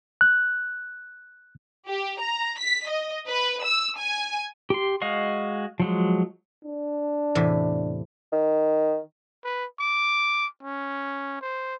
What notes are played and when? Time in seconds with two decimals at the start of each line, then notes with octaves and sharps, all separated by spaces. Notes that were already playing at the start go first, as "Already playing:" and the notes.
0.21 F#6
1.87 G4
2.20 A#5
2.58 B6
2.87 D#5
3.27 B4
3.64 E6
3.98 G#5
4.70 G4 C6
5.02 G#3 F#4 D#5 F5 C#6
5.80 F3 F#3 G#3
6.65 D4
7.35 E2 A2 C3
8.32 D#3
9.44 B4
9.80 D6
10.63 C#4
11.41 C5